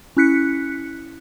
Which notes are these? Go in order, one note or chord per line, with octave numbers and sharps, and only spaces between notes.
C#4 E4 F#6 B6 C#7